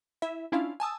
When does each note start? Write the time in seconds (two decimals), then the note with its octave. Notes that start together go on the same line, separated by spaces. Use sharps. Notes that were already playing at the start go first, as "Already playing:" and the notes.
0.22 E4 E5
0.52 C#4 D4 E4 F4 F5
0.80 G#5 A5 D#6 E6